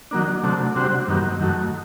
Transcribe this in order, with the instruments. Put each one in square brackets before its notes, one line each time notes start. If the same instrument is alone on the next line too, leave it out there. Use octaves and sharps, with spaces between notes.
[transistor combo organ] D#3 F#3 A#3 D4
C3 F#3 A3 D4
C3 G3 D4 F#4 C5
G2 D#3 F#3 A#3
F#2 D#3 F#3 A3